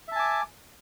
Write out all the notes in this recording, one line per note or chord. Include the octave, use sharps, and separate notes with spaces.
E5 G#5 A5 D6